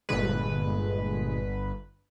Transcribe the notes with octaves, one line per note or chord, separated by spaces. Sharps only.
G1 A#2 D3 G#3 B4